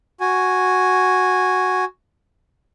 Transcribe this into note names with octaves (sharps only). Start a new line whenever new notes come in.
F#4 G#5